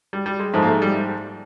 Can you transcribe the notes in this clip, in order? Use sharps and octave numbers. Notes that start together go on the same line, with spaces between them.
G3
G3
G#3
G#2 F3 A3
A#3
A3
G3